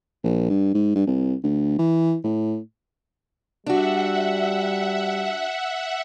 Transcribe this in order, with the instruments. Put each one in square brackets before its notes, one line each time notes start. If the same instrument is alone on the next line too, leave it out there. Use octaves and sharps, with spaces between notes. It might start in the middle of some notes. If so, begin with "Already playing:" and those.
[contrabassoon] A#1
G2
G#2
G2
C2
D2
E3
A2
[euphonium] G3 [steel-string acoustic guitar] D4 F#4 [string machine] E5 F#5